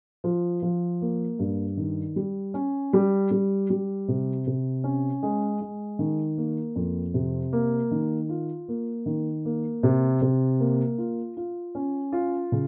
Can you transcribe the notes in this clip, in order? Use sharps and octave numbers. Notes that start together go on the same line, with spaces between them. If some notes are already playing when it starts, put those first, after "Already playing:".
F3
F3
A#3
G2
D#3
G3
C#4
G3
G3
G3
C3
C3
C#4
G#3
G#3
D#3
A#3
F2
C3
A#3
D#3
F4
A#3
D#3
A#3
C3
C3
A#3
F4
F4
C#4
F4
C#3